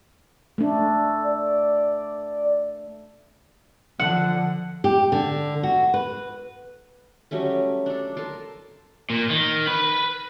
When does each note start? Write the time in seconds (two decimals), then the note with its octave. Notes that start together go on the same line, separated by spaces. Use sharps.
0.58 A3 D4
1.24 D5
3.99 D3 F3 F#5
4.84 G4
5.12 D3
5.63 F#4
5.94 B4
7.31 F#3 G3 A3 C#4
7.86 D4 A4
8.17 A4 A#4 A5 C6
9.10 A#2
9.30 D#3
9.67 B4 B5